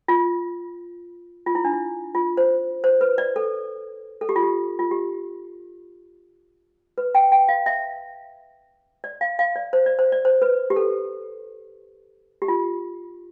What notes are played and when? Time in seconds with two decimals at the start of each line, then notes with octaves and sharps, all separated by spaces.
0.08 F4
1.46 F4
1.55 E4
1.64 D4
1.73 E4
2.15 F4
2.37 C5
2.84 C5
3.01 B4
3.18 D5
3.36 A4
4.21 A4
4.29 G4
4.36 F4
4.43 G4
4.79 F4
4.91 G4
6.98 B4
7.15 G5
7.32 G5
7.49 F5
7.66 E5
9.04 D5
9.21 F5
9.39 F5
9.56 D5
9.73 C5
9.86 D5
9.99 C5
10.12 D5
10.25 C5
10.42 B4
10.70 G4
10.76 A4
12.42 G4
12.48 F4